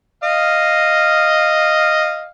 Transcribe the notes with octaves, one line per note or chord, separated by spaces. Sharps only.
D#5 F5